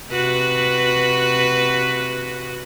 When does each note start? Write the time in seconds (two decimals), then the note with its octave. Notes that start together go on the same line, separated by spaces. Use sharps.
0.11 C3 F#4 B4